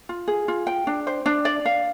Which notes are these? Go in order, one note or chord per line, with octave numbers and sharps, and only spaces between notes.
F4
G#4
F4
G5
D4
C5
D4
D5
F5